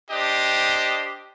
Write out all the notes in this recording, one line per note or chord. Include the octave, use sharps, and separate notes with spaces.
D4 G4 C5 D#5